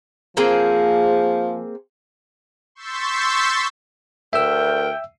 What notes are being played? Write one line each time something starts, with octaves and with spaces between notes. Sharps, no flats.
F3 A#3 C4 G#4
C6 C#6 E6 G6 A6 B6
D2 A#4 E5 G5 E6